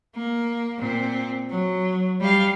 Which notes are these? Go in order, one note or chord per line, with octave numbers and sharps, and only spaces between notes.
A#3
A#2 C4
F#3
G3 F5